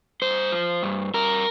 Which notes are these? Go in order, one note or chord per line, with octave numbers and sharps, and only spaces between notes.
G2 C5
F3
G2
G2 A#4